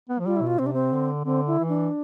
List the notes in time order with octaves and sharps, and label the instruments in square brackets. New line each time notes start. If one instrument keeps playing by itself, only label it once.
[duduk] B3
F3
[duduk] G3 [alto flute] F4
[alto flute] E4
[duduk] B2 [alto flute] F4
[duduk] C3 [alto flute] C4
[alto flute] D4
C4
[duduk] D3
[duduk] D3 [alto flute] C4
[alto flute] E4
[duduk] E3
[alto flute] D4